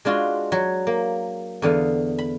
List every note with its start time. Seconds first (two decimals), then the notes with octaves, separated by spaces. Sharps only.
0.05 G#3 D4 F4 F#4
0.52 F#3
0.87 A#3
1.62 E2 D3 B3 F5
2.18 B5